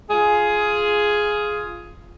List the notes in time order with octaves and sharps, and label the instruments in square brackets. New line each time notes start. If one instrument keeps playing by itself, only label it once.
[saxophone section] F4 G#4